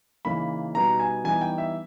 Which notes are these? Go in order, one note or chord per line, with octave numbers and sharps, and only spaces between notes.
C#3 E3 A#3 D#4 B5
B2 G3 B3 D#4 A#5
G#5
E3 G3 B3 D#4 G#5
G5
E5